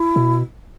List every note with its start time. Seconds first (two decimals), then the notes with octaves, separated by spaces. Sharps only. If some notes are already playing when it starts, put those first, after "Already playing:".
Already playing: E4
0.16 B2